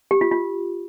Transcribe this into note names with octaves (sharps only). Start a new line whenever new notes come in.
G4
F4
F4